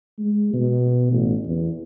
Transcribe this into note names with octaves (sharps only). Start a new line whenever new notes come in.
G#3
B2
A1
E2